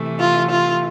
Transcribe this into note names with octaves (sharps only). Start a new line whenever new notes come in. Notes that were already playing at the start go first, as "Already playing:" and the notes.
Already playing: C3 E3 A3
F4
F4